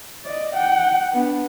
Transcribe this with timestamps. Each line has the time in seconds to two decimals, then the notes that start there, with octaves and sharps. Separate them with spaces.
0.25 D5 D#5
0.55 F#5 G5
1.13 B3 D4